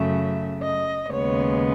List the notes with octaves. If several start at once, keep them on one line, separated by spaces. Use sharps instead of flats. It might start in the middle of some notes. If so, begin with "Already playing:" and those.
Already playing: F#2 C#3 F#3 A3 E5
D#5
D#2 C#3 G#3 B3 C#5